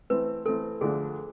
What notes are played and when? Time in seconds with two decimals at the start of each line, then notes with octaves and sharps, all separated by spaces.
0.10 E3 A3 C4 E4 B4
0.46 E3 A3 C4 E4 A4
0.81 D2 D3 F3 A3 D4 G#4